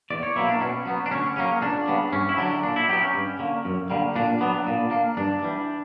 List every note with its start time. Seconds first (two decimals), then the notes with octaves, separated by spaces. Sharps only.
0.11 E2 D5
0.23 C#5
0.36 B2 F#3 A#3 E4
0.49 D4
0.61 B2 C#4
0.86 F#3 B3
1.06 D4
1.11 D2 C#4
1.36 C#3 F#3 A#3 C#4
1.62 C#2 D4
1.87 C#3 G3 B3
2.12 G2 C#4
2.29 E4
2.38 D3 F#3 D4
2.63 A#2 D4
2.76 E4
2.88 F#3 B3 G4
3.02 C#4
3.14 G2
3.39 D3 A#3
3.65 F#2
3.90 D3 G3 A#3
4.16 A#2 D4
4.41 F#3 B3
4.67 A#2
4.91 A#3
5.17 G2 D4
5.42 E3 G3